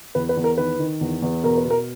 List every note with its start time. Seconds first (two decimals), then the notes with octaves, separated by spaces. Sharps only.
0.15 E2 B4
0.29 B4
0.37 E2
0.44 A#4
0.58 D#3 B4
0.79 D#3
1.01 E2
1.22 E2
1.43 B2 A#4
1.57 B4
1.65 B2
1.70 A#4